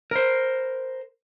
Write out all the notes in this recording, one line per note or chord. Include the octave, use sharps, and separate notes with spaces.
A#4 C5